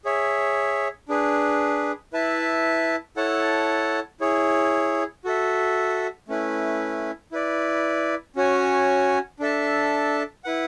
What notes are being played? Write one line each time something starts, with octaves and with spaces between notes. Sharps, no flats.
G#4 C#5 E5
D4 G#4 B4
E4 B4 E5 A5
E4 A4 C#5 F#5 A5
E4 G#4 C#5
F#4 A4 E5
A3 C#4 E4 B4
E4 B4 D5
C#4 F#4 C#5 G#5
D4 A4 E5 A5
E4 B4 F#5